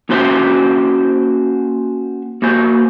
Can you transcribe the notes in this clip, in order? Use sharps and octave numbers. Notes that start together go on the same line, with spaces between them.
A#3 C#4 F#4 C5 E5 G5
A#3 F#4 C5